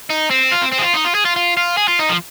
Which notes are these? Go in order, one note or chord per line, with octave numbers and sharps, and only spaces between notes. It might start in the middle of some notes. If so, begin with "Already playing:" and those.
D#4
C4
F4
C4
C4
G#4
F4
D#4
F4
G#4
F4
F4
F4
G#4
F4
D#4
F3